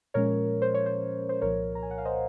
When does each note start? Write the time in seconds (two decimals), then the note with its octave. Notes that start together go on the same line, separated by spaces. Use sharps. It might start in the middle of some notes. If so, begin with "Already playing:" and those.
0.14 A#2 F3 G#3 C#4 A#4 C#5
0.62 C5
0.74 C#5
0.86 C5
1.29 C5
1.42 C2 A#2 F3 A#4 C#5
1.75 A#5
1.83 G#5
1.91 F#5
1.98 F5
2.05 C5 D#5